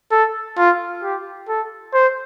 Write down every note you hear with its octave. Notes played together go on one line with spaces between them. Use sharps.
A4
F4
G4
A4
C5